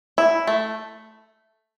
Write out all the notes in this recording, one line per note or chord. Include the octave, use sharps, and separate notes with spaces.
E4
A3